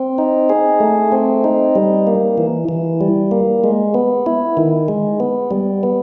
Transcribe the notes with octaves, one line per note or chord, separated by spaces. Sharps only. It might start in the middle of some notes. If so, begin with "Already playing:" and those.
Already playing: C4
D#4
G#4
A3
C4
D#4
G3
A#3
E3
E3
G3
A#3
G#3
B3
E4
D#3
G#3
B3
G3
B3